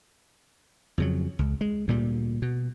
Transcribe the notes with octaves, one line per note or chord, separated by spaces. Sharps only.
F2 C#3 F#3
C#2
G#3
D2 A#2 G3
B2